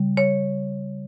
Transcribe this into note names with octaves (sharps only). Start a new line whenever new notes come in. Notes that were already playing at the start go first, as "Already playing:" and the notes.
Already playing: C#3 G3
C#5